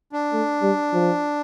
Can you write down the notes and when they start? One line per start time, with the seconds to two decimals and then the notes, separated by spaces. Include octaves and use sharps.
0.13 D4
0.33 A3
0.62 G3
0.93 F3